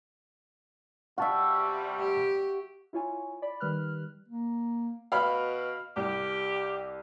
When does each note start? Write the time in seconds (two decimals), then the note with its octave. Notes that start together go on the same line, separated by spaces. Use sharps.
1.18 C3 G3 F#4 E5 F5 A5
2.00 G4
2.93 E4 F4 C#5 G#5
3.42 D5 B5
3.60 D#3 G3 B4 F6 F#6
4.28 A#3
5.12 B2 F5 B5 F6
5.96 C2 G4